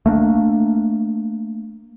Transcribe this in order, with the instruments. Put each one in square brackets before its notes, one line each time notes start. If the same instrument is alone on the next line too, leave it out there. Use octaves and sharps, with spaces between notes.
[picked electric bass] A3 A#3 D4